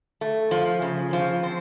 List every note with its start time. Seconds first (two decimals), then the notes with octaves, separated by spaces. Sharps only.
0.21 A3
0.51 F3
0.82 C#3
1.13 F3
1.43 C4